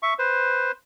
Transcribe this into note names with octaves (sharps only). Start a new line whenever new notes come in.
E5 C#6
B4 C5